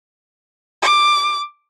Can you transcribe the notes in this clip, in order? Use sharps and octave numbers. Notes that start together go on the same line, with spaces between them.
D6